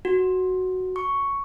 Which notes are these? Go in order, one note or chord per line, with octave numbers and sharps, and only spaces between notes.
F#4
C#6